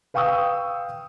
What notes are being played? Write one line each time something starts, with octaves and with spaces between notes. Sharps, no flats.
B4 F5 G5 C#6 D#6 E6